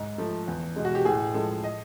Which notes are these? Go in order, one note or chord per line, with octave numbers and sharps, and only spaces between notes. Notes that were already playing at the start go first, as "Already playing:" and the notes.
Already playing: G#2
F3 A3
E2
B2 G#3
F#4
G4
A2 G#4
F3 G#3 A4
D#5